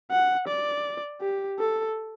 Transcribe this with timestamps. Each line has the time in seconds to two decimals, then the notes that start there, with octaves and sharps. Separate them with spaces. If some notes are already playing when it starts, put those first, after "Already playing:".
0.11 F#5
0.47 D5
1.21 G4
1.59 A4